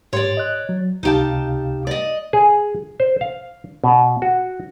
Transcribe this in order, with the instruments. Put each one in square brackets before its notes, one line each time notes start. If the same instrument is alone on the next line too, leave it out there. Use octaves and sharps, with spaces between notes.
[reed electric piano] G#2 G4 C6 [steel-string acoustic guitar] C#5 D5
[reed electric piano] D#5 F#6
F#3
[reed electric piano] C#2 C3 F5 [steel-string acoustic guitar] D#4 G4 A5
[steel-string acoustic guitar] D5 D#5
[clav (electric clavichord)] G#4
C5
F5
B2
F#4